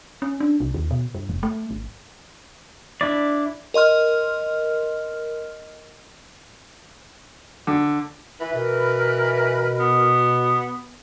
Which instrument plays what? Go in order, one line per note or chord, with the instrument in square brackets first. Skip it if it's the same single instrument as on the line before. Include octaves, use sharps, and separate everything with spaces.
[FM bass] C#4
D4
C2
D#2
B2
G2
F1
A3
G#1
[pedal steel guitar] D4 E4 D5
[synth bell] A#4 D#5 C6 F6
[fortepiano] D3
[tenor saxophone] E3 [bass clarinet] E4 [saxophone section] B4
[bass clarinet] B2 [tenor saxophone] E3 [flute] A#4
[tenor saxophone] B3